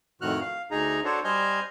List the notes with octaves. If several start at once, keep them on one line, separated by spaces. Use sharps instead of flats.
F2 A2 D#3 F#4 F6 F#6
F5
D2 D#4 G#4 A#5
D4 F#4 A4 C5 C#5
G3 C5 D#5 G#5 F6 G6